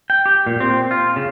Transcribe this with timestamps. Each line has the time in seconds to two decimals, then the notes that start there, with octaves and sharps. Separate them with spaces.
0.10 G5
0.26 G4
0.46 A#2
0.60 C4
0.91 F4
1.16 C#3